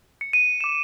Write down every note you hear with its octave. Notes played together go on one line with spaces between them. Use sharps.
C#7
D#7
D6 E7